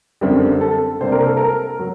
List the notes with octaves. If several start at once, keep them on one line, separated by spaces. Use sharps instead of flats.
F#2 D3 G3 C4
A4
C3 G3 A#3 D4 C5
A#4
A4
A#4
F#3